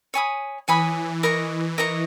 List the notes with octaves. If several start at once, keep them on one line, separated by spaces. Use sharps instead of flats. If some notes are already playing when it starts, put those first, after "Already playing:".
C#5 G#5 B5 D#6
E3 C#5 G#5 B5 D#6
E3 A#4 D#5 A#5 C#6
A#4 D#5 A#5 C#6